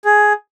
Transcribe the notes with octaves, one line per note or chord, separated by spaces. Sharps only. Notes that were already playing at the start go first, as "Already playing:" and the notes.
G#4